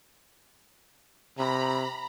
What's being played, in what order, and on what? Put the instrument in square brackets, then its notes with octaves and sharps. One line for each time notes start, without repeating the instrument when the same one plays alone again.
[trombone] C3 [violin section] A#5 B5